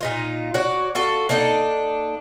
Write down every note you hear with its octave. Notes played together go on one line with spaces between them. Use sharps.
A#2 D#4 F4
F#4 C#5 D5
F4 F#4 A4
A#3 D4 D#4 A4